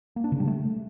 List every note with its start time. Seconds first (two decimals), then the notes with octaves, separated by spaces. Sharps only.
0.16 A#3
0.24 D4
0.32 C#3
0.40 G3
0.47 A3